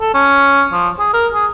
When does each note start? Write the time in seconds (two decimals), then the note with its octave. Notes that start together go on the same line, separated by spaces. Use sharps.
0.01 A4
0.14 C#4
0.73 F3
0.99 G#4
1.13 A#4
1.34 G#4